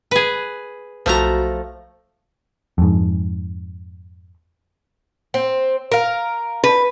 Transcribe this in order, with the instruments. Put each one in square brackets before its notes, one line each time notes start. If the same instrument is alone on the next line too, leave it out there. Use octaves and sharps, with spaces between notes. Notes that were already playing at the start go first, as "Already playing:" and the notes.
[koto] G#4 B4
[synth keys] B1 F#4 [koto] F3 A3 A#5
[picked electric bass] F2 G#2
[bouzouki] C4
A#4 F5
[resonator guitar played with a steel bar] B4